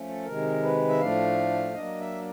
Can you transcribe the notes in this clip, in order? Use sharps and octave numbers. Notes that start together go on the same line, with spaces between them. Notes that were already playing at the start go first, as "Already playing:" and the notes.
Already playing: F3 A3 C#4
A4
C3 D#3 G#3 A#4
B4
E5
A2 F3 A3 D4 F5
F#3 A#3 D4 D#5
E5